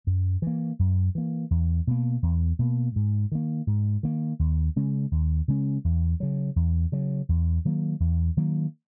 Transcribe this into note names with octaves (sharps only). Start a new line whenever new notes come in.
F#2
E3 A#3
F#2
E3 A#3
E2
B2 A#3
E2
B2 A#3
G#2
D#3 A#3
G#2
D#3 A#3
D#2
C#3 G#3 C#4
D#2
C#3 G#3 C#4
E2
C#3 F#3
E2
C#3 F#3
E2
D#3 F#3 A#3
E2
D#3 F#3 A#3